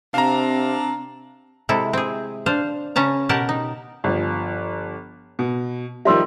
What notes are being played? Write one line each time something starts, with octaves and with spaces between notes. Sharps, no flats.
C3 C4 D4 F5 A#5
C3 G#3 E4 A4
C4 G#4
D4 C5 F5
C#3 C#4 A5 A#5
B2 G4 A#4 F#5 A5
D#4
G1 F3
B2
D#3 F3 G3 E5 C6 E6